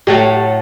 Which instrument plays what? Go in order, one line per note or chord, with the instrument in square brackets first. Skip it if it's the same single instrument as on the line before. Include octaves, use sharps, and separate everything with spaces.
[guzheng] A2 F#3 A3 [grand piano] G4